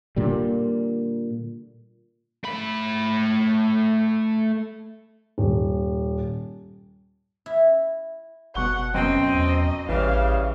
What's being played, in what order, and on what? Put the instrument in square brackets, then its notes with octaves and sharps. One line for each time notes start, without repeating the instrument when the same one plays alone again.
[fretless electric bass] A#2 D3 G3
[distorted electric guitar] A3 B5
[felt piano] D#1
[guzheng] E4
[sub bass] F#1 [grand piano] B2 C#6 G7 [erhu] F#5
[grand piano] F#2 B2 [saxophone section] C4 [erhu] D#5
[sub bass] E2
[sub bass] A1 [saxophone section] C#3 G3 [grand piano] E3 [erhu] F5